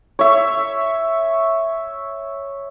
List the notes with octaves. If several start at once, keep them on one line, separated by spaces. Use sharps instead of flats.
C#5 E5